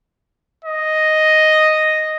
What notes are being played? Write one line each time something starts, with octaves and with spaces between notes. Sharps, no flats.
D#5